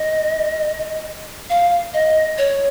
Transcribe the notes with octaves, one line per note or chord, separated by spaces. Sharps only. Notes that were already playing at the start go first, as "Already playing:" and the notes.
Already playing: D#5
F5
D#5
C#5